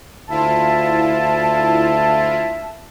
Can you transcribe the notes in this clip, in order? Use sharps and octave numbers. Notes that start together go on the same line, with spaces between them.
D2 E4 F4 E5 A5